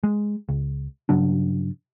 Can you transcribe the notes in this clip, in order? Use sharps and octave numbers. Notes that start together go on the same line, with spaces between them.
G#3
C#2
G2 C#3 F#3 D4